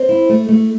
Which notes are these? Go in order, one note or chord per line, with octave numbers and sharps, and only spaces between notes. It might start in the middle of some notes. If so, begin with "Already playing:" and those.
Already playing: C4
E4
A3
A3